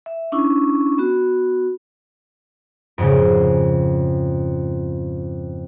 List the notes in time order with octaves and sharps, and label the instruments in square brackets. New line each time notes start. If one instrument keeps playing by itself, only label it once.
[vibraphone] E5
C#4 D4 E4 C#6
B3 F#4
[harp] F2 G#2 C#3